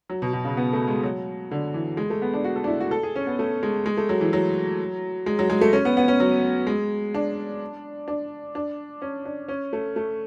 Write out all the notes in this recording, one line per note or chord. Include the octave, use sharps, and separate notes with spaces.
F#3
B2
B2
C#3
B3
A3
G#3
F#3
D3
E3
G#3
A3
B3
D4
F#4
A4
D4
E4
F#4
A4
G#4
C#4
B3
A3
G#3
G#3
A3
F#3
E3
F#3
G#3
F#3
G#3
A3
C#4
B3
B3
C#4
F#3
G#3
D4
D4
D4
C#4
D4
C#4
A3
A3